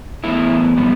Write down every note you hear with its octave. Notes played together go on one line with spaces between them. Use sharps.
A2 E3 B3 E4
B2 G3 B3